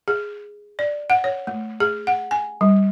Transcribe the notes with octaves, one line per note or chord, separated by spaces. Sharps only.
G#4
D5
F#5
C#5
A3
G#4
F#5
G#5
G3